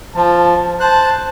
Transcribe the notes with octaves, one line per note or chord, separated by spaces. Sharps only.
F3 A5
C5 A5 F#6